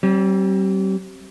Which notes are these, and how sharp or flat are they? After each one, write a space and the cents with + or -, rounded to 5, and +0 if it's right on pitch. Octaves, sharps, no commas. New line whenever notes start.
G3 -35 C4 +30